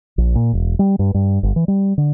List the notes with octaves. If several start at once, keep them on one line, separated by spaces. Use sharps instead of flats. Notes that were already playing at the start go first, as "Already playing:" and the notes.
A#1
A#2
E1
G3
G2
G2
G1
E3
G3
D3